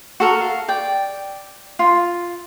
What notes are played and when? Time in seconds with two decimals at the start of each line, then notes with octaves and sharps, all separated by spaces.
0.20 F#4 A4 A#4
0.41 F5
0.68 D5 G5
1.79 F4